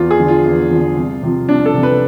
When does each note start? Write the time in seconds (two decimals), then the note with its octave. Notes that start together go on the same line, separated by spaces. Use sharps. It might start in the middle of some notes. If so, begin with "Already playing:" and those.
Already playing: E2 F4
0.11 G#4
0.20 D3 F3
0.28 F4
0.45 E2
0.71 D3 F3
0.97 C2
1.23 C3 F3
1.49 C2 D4
1.66 A4
1.74 C3 F3
1.83 B4